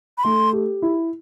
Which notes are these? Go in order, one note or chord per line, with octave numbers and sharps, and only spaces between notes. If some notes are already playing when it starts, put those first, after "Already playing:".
B5
A3 C6
G4
E4